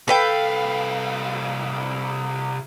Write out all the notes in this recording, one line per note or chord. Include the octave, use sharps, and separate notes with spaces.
C2 A4 B4 F5 G5